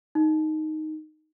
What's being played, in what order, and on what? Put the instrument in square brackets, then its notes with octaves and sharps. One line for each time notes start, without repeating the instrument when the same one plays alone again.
[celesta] D#4